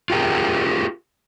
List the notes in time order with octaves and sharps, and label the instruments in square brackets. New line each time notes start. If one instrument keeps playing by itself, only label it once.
[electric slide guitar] F4 G4 G#4 A#4